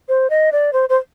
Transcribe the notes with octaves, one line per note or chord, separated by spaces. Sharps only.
C5
D#5
D5
C5
C5